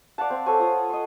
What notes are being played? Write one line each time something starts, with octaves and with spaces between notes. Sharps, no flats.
D5 F5 F#5 A5
C4
A4 C5 C#5 G#5
F4 C#5 D#6
F#5
D#5 C6